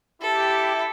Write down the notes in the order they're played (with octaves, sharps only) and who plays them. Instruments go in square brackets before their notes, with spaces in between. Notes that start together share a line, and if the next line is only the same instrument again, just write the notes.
[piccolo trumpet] E4 [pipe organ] G4 [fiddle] A4